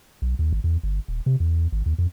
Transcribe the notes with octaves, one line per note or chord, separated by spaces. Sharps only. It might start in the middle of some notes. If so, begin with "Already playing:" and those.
B1
D#2
G#1
E2
G1
D#1
C3
E2
G#1
D#2
F2